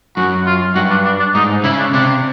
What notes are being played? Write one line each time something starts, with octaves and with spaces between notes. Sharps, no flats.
F#2 F#4
F4
G2 F#4
D4
D4
D4
G#2 D#4
C#3 E4
D4
C3 D4